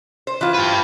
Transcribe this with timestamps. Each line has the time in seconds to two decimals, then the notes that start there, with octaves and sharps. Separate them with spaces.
0.27 C5
0.41 E3 F4
0.54 G4 B4